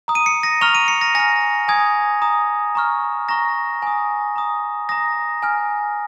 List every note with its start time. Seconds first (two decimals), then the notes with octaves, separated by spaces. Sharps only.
0.08 A#5 D#6
0.15 D#7
0.26 C#7
0.43 A#6
0.61 A#5 C#6 F6 F7
0.75 D#7
0.88 C#7
1.01 A#6
1.15 G#5 F6 A#6
1.68 G#5 D#6 G#6
2.22 A#5 D#6
2.75 A#5 C#6 F6
3.29 A#5 C#6 F6 A#6
3.82 G#5 D#6
4.36 A#5 D#6
4.89 A#5 D#6 A#6
5.43 G#5 F6